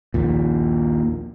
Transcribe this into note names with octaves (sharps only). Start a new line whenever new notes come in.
A#1 D#2 A#2